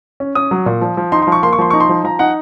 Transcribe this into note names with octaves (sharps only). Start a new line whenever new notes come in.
C#4
C#4 D#6
F#3
A#2
F3
F3
D#4 C6
C6
F3
C#6
A#3 C6
C#6
F3 C6
D#4 C#6
C6
F3
F3 A#5
D#4 F#5